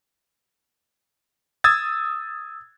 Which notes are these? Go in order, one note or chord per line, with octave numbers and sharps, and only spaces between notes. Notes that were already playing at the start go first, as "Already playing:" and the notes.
D#6 E6 G#6 A6